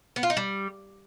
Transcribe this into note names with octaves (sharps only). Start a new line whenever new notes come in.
B3
F4
D#4
G3